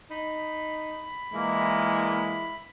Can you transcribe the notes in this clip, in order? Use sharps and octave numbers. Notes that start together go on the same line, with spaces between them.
D#4 B5
A#2 E3 G#3 A#3 E4